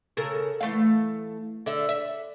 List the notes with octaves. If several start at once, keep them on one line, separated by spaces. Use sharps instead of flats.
C#3 A4 A#4
E3 A3 F5
D3 E5
E5